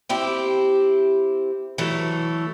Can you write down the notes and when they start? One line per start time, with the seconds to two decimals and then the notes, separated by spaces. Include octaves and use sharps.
0.09 C4 E4 G4
1.78 E3 F#3 A3